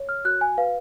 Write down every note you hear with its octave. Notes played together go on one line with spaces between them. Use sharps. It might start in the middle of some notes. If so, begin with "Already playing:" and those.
Already playing: C#5
F6
F#4 F#6
G#5
B4 F5